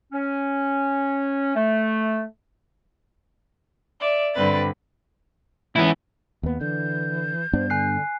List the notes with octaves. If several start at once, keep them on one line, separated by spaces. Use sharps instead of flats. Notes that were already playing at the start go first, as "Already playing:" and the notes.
C#4
A3
D5 E5
G2 D3 G3 C4 B4 A6
G#2 E3 B3 C#4 E4
D#2 A#3 B3
D3 E3 G6
G2 B3 D4 C5
D3 G#5 F#6 C7